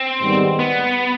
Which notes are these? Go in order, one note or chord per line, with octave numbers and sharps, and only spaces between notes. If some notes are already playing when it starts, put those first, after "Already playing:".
Already playing: C4
G#2 D#3 G3 B3
B3